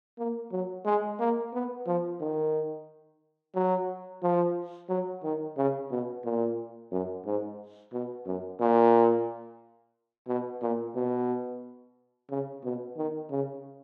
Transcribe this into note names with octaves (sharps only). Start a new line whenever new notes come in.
A#3
F#3
G#3
A#3
B3
F3
D#3
F#3
F3
F#3
D#3
C#3
B2
A#2
F#2
G#2
B2
F#2
A#2
B2
A#2
B2
C#3
B2
D#3
C#3